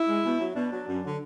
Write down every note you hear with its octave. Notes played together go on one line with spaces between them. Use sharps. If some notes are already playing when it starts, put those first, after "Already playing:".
Already playing: E4
G#3
B2
F#3
B2 D4
F#3
F#2
D3 F#3